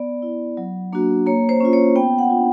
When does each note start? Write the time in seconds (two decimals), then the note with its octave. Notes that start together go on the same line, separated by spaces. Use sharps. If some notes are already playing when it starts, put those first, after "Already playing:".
Already playing: B3 D5
0.22 E4
0.57 F#3
0.93 A#3 D4 F#4
1.26 A#3 C#5
1.49 C5
1.60 C#4 F4
1.73 C#5
1.96 B3 G5
2.18 F#5
2.30 D4 F4